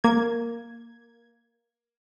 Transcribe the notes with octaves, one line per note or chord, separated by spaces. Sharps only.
A#3 G#6